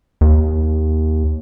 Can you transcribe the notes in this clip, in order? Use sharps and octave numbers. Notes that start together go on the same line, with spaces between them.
D#2